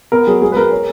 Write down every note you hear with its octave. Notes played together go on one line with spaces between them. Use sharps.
B3 A#4
F#3 G#4
G#3 G#4
B4
G#3 A#4
C#4